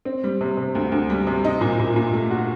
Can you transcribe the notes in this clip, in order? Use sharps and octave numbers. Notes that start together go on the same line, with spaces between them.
C4
G3
C3
C3
D2
D2
G3
C3
D#4
A#2
A#2
A#2
A3
F#4